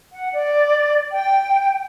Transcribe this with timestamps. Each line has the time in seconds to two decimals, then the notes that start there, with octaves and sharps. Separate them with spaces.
0.12 F#5
0.32 D5
1.13 G5